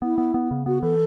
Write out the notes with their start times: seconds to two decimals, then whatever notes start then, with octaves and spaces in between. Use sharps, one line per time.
0.02 B3 E4
0.18 B3
0.34 B3
0.51 C#3
0.66 B3 F#4
0.82 E3 A4